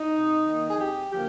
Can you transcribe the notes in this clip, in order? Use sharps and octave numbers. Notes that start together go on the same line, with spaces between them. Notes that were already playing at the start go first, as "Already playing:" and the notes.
Already playing: D#4
C3
D#3 A#3
G#4
F2 G4
D3 F3 A#3 G4